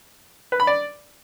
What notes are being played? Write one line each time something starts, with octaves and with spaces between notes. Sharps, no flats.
B4
B5
D5